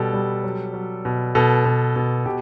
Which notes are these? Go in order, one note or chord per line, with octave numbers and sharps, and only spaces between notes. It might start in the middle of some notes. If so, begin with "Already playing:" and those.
Already playing: B2 G3 A4
G3
F#3
F#3
B2
B2 A4
B2
B2
B2 G4